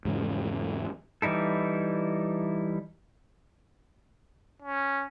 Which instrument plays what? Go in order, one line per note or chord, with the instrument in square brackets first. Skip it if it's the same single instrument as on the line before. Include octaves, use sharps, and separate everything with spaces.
[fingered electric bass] E2 G#2 C#3
[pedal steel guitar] E3 G3 D#4 E4 A4
[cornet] C#4